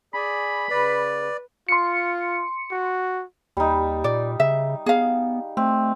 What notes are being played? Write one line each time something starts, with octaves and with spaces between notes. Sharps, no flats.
G#4 D5 G#5 B5
C#3 B4 D5
F4 C6 C#7
F#4
D#2 G3 D#4
A#2 D5
C#3 E5
B3 G#4 F5
A3 C4